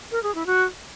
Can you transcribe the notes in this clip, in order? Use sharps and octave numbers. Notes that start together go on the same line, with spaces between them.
A#4
G#4
E4
F#4